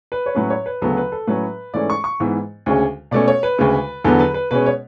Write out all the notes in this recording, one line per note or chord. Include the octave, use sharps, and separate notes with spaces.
B4
C#5
A2 F#3 C#4 B4
C#5
B4
D2 C#3 F#3 B3 A4
B4
A4
A2 F#3 C#4 B4
G#2 E3 A3 C#4 D5
C#6
C#6
G#2 E3 B3
D2 C#3 G#3 C#4
B2 A3 C#4 D5
C#5
B4
D2 C#3 G#3
E2 D3 F#3 B3 A4
B4
B4
B2 G#3 C#4 B4
C#5